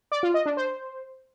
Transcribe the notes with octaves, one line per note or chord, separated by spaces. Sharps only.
D5
F4
D#5
D4
C5